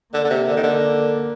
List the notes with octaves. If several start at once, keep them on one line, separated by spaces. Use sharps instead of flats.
D3 A#3
D3
C3
D3
D#3
D3